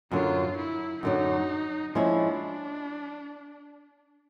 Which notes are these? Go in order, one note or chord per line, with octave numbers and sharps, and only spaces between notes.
F#2 D3 F#3 F4
E4
F#2 D3 F#3 D#4
F3 G#3 C#4 D4 E4